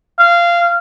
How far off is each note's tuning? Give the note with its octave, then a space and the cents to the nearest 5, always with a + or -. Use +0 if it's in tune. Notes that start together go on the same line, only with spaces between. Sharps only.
F5 -20